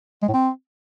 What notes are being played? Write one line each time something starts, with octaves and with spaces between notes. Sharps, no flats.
G#3
A2
C4